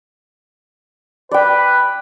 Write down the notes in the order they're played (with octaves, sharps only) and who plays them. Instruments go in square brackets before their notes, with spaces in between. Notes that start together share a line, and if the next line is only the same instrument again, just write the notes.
[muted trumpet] B4 [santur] D5 G5